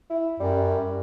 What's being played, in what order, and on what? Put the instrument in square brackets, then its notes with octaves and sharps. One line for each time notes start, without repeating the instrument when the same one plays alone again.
[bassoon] E4
[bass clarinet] F#2 [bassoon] G3